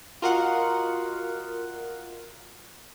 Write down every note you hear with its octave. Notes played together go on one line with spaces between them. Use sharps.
F4 F#4 A#4 D#5 F5 F#5